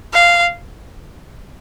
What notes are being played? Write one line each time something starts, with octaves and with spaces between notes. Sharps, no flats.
F5